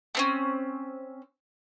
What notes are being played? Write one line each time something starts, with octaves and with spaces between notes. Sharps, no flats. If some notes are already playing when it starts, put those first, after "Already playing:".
A3 C4 C#4